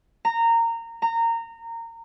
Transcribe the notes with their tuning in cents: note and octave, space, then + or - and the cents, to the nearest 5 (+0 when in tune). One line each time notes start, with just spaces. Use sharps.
A#5 -20
A#5 -20